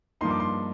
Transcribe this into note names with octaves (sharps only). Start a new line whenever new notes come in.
G2 F3 A#3 D#4 C6
D6
C6